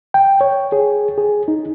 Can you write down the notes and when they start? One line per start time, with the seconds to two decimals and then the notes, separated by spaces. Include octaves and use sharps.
0.14 G5
0.41 C#5
0.72 G#4
1.18 G#4
1.48 D#4